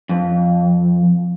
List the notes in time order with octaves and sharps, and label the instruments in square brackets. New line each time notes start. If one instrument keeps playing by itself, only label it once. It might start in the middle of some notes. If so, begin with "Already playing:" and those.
[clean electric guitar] F2